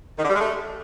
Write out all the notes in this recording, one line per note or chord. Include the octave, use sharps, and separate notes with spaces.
D#3
D3
G3
G#3
A3